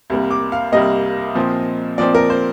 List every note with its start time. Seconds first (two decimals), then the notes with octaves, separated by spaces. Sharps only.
0.10 C2 C3 G3 A#3
0.31 D6
0.52 F5
0.72 C2 C3 G3 A#3 D#5
1.35 A#2 F3 C4
1.98 A#2 F3 C4 D5
2.15 A#4
2.30 C5